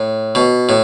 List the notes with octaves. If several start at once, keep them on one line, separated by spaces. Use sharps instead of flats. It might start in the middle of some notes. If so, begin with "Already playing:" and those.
Already playing: A2
B2
A2